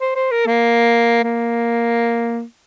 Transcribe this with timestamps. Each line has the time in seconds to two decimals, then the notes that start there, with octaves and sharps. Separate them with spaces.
0.01 C5
0.16 C5
0.31 A#4
0.46 A#3
1.23 A#3